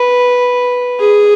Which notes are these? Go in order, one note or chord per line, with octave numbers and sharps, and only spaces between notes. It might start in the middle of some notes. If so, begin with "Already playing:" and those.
Already playing: B4
G#4